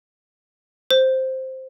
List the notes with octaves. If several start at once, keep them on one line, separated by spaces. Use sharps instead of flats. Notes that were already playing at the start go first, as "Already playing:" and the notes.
C5